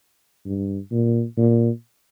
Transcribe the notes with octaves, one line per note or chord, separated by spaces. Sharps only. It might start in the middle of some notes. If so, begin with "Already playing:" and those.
G2
A#2
A#2